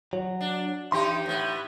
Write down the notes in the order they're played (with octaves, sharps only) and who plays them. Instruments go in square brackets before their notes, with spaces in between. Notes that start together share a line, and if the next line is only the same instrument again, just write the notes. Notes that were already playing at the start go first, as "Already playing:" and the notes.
[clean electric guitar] F#3
[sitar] D4
[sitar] E3 D#4 G4 [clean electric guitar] C6
[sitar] A2 B3